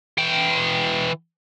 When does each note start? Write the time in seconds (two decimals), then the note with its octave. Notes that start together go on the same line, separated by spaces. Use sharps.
0.18 E3 G5